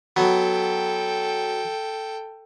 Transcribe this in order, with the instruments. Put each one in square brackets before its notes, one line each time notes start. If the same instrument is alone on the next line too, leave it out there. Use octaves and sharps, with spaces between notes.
[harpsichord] F#3 B3 [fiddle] A4 G5